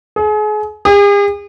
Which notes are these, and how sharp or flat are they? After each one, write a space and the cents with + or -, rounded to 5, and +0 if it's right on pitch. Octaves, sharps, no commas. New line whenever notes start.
G#4 +35
G#4 -45